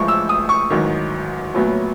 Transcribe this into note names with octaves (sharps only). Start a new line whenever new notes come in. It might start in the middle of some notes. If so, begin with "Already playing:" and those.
Already playing: A1 A2 F3 G#3 C#6
E6
D#6
C#6
A1 G#2 D#3 F#3
A#1 A2 F#3 B3